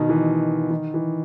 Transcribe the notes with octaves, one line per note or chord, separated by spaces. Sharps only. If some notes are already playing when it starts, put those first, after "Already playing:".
Already playing: B2 D#3
E3
D#3
E3